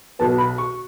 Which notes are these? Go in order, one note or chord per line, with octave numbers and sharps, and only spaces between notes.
B1 B2 B3 A5
B5
C#6